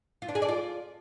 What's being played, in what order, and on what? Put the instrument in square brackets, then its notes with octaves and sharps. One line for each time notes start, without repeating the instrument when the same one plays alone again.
[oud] F4
D4
G#4
D5
F4